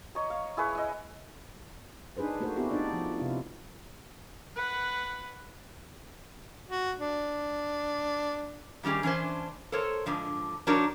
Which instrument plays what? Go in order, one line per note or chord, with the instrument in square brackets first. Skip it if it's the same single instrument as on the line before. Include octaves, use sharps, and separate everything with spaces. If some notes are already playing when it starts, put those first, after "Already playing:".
[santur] C#5 D#5 A#5
F5
E4 G#4 B4 C#5
E4 D#5
[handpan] D4 D#4 G#4 B4 C5
A3 A#3 F#4 C5
B3 C4 E4 F#4 G4
D4 D#4 D5
F3
C3 E4 F4
[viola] B4 F#5
[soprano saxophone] F#4
D4
[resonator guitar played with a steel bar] D#3 G3 C#4 G4 G#4
E3 C#4 D4 B4 C5
A4 A#4 C5 C#5
G#2 D3 F3
F3 D4 D#4 F#4 A#4 C#5